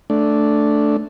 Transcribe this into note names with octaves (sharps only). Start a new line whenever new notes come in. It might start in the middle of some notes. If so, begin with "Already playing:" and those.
A3 D4